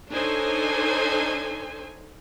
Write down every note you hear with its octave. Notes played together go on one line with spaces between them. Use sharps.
D4 D#4 A4 C5 C#5 G#5